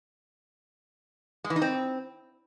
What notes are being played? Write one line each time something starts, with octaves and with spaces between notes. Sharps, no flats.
G#3
E3
D#4
C4